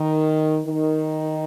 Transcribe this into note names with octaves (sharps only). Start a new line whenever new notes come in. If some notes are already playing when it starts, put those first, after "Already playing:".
Already playing: D#3
D#3